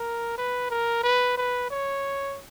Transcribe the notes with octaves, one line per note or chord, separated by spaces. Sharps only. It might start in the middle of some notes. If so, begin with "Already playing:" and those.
Already playing: A#4
B4
A#4
B4
B4
C#5